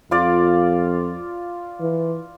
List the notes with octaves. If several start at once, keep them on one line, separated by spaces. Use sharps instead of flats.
F2 F4 D5
E3